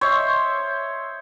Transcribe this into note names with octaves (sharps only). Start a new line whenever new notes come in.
C5 C#5 D#5 E5